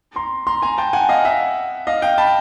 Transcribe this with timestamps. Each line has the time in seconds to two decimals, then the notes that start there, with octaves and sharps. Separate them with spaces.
0.16 A#5 C6
0.47 A#5 C6
0.62 G#5 A#5
0.78 G5 A5
0.93 F#5 G#5
1.09 D#5 F5
1.25 E5 F#5
1.87 D#5 F5
2.02 F5 G5
2.18 A5 B5